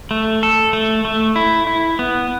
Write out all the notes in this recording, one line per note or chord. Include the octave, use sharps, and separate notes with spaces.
A3
A4
A3
A3
E4
E4
B3